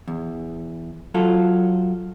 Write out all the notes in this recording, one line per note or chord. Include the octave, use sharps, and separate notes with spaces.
E2
F#3 F4 A4